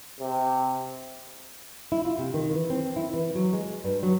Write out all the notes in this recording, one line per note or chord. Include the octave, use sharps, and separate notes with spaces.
C3
E4
F4
C3
D#3
E3
C4
E4
E3
F#3
G#3
G2
F#3